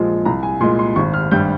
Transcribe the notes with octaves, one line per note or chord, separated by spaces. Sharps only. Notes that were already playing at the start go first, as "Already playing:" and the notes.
Already playing: A#1 A#2 F3 G#3
C2 A#5
G#5
A#2 G#3 C6
C6
G#1 C#6
F6
G2 G3 G6